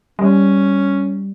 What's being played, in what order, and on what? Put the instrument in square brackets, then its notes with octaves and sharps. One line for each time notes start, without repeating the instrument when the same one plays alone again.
[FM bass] G3 [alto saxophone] C#4